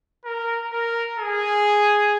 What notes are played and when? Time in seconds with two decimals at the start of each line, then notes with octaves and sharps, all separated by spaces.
0.25 A#4
0.72 A#4
1.19 G#4